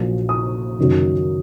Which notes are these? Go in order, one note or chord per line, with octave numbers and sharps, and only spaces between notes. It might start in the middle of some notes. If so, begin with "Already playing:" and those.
Already playing: A#1 A#2 F#3
D#6
F#1 F#2 D#3 F#3